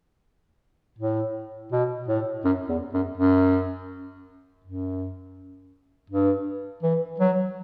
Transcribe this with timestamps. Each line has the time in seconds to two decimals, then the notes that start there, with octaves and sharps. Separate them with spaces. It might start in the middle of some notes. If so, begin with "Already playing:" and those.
0.98 A2
1.72 B2
2.08 A2
2.45 F#2
2.69 E2
2.94 F#2
3.17 F#2
4.64 F#2
6.10 G2
6.83 E3
7.20 F#3